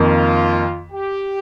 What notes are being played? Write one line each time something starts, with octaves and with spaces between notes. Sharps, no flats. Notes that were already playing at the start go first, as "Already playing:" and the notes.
Already playing: F2 D#3 A#3 F4
G4